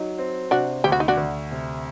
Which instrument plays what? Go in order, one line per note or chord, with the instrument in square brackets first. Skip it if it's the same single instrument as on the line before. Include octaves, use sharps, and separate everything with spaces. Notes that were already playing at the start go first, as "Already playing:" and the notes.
Already playing: [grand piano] F#3 [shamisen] D#4
[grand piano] C4
[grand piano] C3 [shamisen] D4 F#4
[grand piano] D2 [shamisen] G4
[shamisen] F#4
D#4
D4 F#4
[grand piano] D2
C3